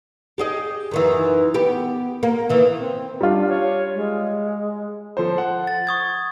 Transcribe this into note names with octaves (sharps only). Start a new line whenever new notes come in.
G4 G#4 D#5
F#2 D#3 E3
B3 G4
A#3
D#3 E3
C4
G3 D4 F4
C#5
G#3
F3 A4 C5
F#5
A6
C#6 D#6 G#6